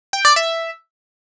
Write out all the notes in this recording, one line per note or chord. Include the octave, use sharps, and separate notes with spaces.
G5
D5
E5